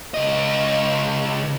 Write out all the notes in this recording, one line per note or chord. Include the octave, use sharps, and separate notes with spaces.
C#2 D#5